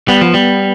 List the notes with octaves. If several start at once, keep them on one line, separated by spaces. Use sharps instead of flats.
G3 B3
F3
G3